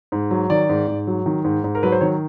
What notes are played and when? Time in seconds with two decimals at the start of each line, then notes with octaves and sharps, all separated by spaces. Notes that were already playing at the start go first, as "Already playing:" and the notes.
0.12 G#2
0.31 F#3
0.50 D#3 D5
0.69 G#2
0.88 G#2
1.07 F#3
1.26 D#3
1.44 G#2
1.64 G#2
1.75 A#4
1.83 F#3 B4
1.92 C5
2.01 D#3 C#5